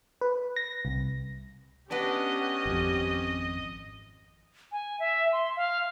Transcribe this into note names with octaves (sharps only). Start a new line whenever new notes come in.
B4
A#6
C2
B3 C#4 D4 G4 D#5
G#1 F2
G#5
E5
C6
F5